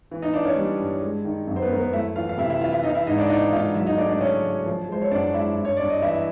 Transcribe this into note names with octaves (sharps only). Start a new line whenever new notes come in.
E3
D#4 D#5
E3 D4 D5
C#4 C#5
G3
G2
G#3
D#3
F#2
C5
B3 B4
F#2 A#4
B3 B4
A3 E4 E5
E3 F4 F5
F5
C3 E4 E5
E4 E5
E3 F4 F5
E4 E5
E3 D#4 D#5
F5
E4 E5
G#2 D#4 D#5
D4 D5
E3 D#4 D#5
G#2 F4 F5
F#3 E4 E5
D#4 D#5
A3 D4 D5
D4 D5
C#3 C#4 C#5
F#3
F3
G#3 C5
C#5
F#2 D4 D5
G#3 E4 E5
G2
C#5
G2 D5
D#5
E3 E4 E5
E5